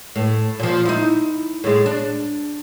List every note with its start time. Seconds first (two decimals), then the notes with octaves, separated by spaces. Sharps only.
0.16 A2
0.60 A#2 F3
0.85 D#4 E4
1.64 A2 G#3
1.86 D4